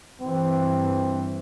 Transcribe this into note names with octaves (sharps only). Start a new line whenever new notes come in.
G2 E3 C4